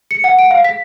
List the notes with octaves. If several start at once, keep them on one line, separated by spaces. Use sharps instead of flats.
C#7
F#5
D7
F5
B6